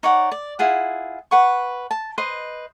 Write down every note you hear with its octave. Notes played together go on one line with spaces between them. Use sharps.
D#4 C#5 D5 F#5
D5
E4 F4 G#4 F#5
B4 F#5 C#6
A5
B4 C5 D#5